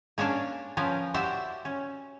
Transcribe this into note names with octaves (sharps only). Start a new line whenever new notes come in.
A#3 C#4 D4 C#5 D5
F3 C#4 A#4 B4
E4 F#4 G4 C5 D5 E5
C#4